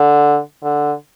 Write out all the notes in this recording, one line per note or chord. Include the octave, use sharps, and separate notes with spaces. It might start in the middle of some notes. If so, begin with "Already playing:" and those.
Already playing: D3
D3